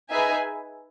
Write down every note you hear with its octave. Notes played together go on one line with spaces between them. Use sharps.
D#4 G#4 B4 E5 G#5